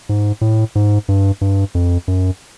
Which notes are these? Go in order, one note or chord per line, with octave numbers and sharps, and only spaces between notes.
G#2
A2
G#2
G2
G2
F2
F#2